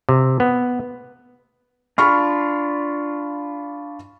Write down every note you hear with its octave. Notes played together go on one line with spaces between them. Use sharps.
C3
B3
D4 F4 B5 C#6 F6